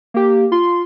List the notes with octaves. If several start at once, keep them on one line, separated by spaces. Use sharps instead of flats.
A#3 G4
F4 C6